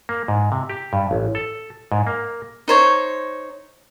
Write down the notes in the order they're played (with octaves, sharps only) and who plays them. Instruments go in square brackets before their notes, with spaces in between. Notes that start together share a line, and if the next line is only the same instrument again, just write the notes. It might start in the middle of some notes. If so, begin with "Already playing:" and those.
[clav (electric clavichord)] A#3
G#2
C3
G4
G2
A1
A4
G#2
A#3
[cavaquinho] D#4 C5 C#5